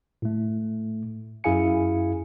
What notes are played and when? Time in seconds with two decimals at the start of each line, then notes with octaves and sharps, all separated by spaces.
0.22 A2 A3
1.44 F#2 E4 G#4 F5 G#5 C#7